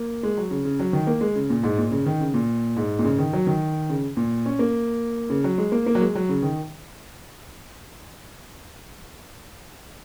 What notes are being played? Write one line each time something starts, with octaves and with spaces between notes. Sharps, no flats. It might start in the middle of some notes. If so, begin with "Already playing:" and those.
Already playing: A#3
G#3
F#3
C#3
C#3
F#3
D#3
A#3
G#3
C#3
A#2
G#2
A#2
C#3
D#3
C#3
A#2
G#2
A#2
C#3
D#3
F#3
D#3
C#3
A#2
C#4
A#3
C#3
F#3
G#3
A#3
A#3
F#3
G#3
F#3
C#3
D#3